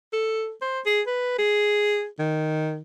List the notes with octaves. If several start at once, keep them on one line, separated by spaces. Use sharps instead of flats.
A4
C5
G#4
B4
G#4
D#3